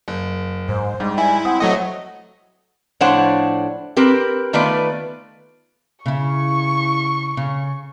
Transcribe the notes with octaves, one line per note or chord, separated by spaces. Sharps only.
F#1
G#2 C5
G#2 G3
E4 G#5
C4 F#5 D#6
F#3 A3 D#5
A2 F3 D4 C5 C#5 F#5
C4 G4 A#4 B4
D#3 A3 B3 F4 B4 D5
C#3 E4 C#6
C#3